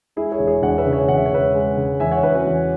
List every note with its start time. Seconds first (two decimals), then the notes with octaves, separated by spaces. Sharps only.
0.16 G#3 E4 G#4
0.32 G#4 C#5
0.39 E1
0.47 G#4 C#5
0.62 E1 C#5 F#5
0.78 B4 E5
0.85 C#3
0.93 G#4 C#5
1.08 E1 F#5
1.18 E5
1.26 C#5
1.31 E1 B4 E5
1.55 G#3
1.77 C#3
2.00 E2 E5 G#5
2.11 C#5 F#5
2.23 E2 B4 E5
2.35 C#4 F#4
2.47 E2